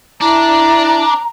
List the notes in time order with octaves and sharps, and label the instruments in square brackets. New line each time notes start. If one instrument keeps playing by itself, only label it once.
[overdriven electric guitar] D4 [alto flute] E4 [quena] A#5